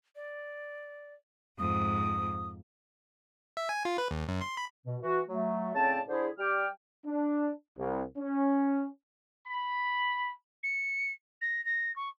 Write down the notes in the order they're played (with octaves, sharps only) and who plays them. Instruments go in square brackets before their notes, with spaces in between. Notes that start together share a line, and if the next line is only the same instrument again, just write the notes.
[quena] D5
[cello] F2 G#2 [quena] D#6
[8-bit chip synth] E5
G#5
F4
B4
D#2
F#2
C6
B5
[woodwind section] B2
E3 F#4
F#3 A3
A2 C#3 C4 D5 A5
D3 E4 G#4 C5
G3 G5 D6 F6
[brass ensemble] D4
C2
C#4
[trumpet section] B5
[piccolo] C#7
A#6
A#6
C#6